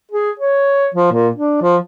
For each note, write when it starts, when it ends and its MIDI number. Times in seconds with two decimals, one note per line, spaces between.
0.12 0.31 68
0.39 0.88 73
0.95 1.10 53
1.12 1.28 46
1.36 1.61 62
1.62 1.77 53